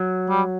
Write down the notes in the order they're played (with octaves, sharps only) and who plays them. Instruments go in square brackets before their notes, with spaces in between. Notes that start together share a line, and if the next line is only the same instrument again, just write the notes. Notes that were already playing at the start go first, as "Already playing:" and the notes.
Already playing: [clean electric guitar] F#3
[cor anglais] G3